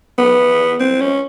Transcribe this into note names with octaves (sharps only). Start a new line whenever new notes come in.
B3
C4
C#4